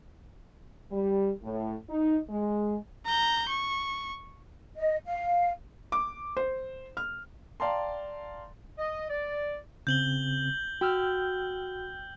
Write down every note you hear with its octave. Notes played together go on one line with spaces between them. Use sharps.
G3
A2
D#4
G#3
A#5 G6
C#6
D#5
F5
D6
C5
F6
D5 F5 G5 A5 A#5 C6
D#5
D5
C#3 C4 G6 F#7 G7
F#4 G5 E6 F6